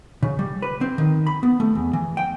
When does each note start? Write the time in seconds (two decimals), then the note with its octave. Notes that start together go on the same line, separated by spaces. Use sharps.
0.23 C#3
0.39 G3
0.62 B4
0.81 C4
0.98 D#3
1.27 B5
1.43 B3
1.60 A3
1.75 E2
1.93 E3
2.17 G5